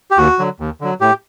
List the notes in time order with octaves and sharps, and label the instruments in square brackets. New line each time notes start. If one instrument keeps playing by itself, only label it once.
[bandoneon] G4
D#2 F#4
D3 F#3
D#2
D3 F#3
A2 G4